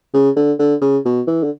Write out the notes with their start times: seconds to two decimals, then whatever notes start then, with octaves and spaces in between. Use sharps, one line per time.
0.14 C#3
0.36 D3
0.59 D3
0.82 C#3
1.05 B2
1.27 E3
1.43 D3